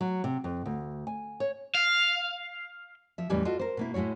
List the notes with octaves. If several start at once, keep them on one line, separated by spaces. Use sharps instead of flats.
F#3
C3
F2
D2
G#5
C#5
F5
F3 E5
E2 A2 E3 G3 G#3 C#4
F4 F#4 A4 D#5
A#4 C5
B2 A#3 E4
A2 G#3 E4 F#4 C#5